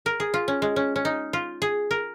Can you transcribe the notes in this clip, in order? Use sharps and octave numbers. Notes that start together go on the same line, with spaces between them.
A#4
G#4
F4
C#4
G#3
C#4
C#4
D#4
F4
G#4
A#4